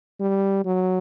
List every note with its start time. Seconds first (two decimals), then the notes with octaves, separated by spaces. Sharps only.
0.20 G3
0.65 F#3